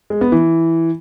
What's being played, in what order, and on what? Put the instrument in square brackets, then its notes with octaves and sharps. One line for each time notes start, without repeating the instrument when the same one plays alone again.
[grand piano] G#3
B3
E3